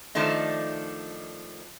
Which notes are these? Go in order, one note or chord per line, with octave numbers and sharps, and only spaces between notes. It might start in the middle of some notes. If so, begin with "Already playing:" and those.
D#3 F3 A3 D4 D#4